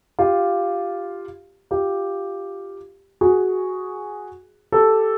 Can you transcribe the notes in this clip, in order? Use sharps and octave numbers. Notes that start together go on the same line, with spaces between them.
F4 G4
F4 G4
F#4 G#4
G4 A4